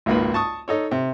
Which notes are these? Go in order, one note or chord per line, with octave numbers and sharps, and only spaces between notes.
G#1 C#2 A#3 B4
A5 C#6 D#6
D#4 A4 C#5
C3